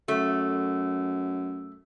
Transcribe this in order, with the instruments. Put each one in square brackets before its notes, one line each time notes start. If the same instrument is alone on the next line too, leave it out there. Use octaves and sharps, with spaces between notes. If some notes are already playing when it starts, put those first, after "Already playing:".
[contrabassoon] F#2 [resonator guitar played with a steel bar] A3